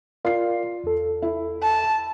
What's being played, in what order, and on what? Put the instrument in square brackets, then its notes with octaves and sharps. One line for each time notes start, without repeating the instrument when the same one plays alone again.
[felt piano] F4 C7 [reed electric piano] A#4 D5 F5
[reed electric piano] E2 A4
[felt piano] E4
[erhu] A5